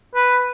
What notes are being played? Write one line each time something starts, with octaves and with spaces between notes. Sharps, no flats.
B4